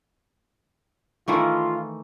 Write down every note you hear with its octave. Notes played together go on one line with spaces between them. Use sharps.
D#3 E3 A3 F4